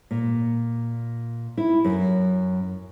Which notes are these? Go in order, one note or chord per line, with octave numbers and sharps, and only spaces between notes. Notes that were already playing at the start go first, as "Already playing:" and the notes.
A#2
E4
F#2